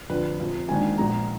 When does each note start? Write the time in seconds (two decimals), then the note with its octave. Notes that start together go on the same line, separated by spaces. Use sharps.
0.10 F1 F2 D3 B4
0.39 F1 F2 F3
0.68 G#1 G#2 D#3 A#3 D4 G#5
0.98 A#1 A#2 F3 G#3 B3 A#5